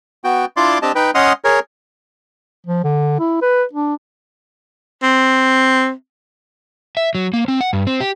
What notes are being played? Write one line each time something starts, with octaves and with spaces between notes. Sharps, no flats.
B3 F#4 G5
D4 E4 F4 D5 C6 D6
C4 D4 G4 D#5 A5
D#4 B4 G5
C#4 D#5 F#5 C6 D#6 F6
G#4 A#4 C#5
F3
D3
E4
B4
D4
C4
E5
F#3
A#3
C4
F#5
G2
C4
G4